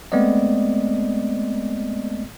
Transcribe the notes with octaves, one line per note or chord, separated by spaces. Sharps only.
G#3 A3 B3 C4 D5 D#5